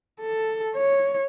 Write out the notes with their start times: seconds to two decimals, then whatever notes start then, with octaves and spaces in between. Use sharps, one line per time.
0.21 A4
0.75 C#5